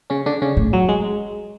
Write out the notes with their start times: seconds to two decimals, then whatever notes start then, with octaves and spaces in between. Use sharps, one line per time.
0.10 C#3 C#4
0.26 D3 D4
0.42 C#3 C#4
0.57 A2
0.73 F#3
0.89 G#3